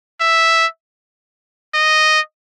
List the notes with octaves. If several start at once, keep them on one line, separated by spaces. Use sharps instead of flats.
E5
D#5